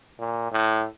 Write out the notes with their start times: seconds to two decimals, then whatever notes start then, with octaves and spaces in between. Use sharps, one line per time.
0.19 A#2
0.52 A2